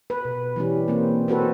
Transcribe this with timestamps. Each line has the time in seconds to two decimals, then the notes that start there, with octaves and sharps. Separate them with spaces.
0.10 B4
0.25 B2
0.56 E3 G3 C#4
0.88 A#3 C4
1.28 C4 F#4 A4 B4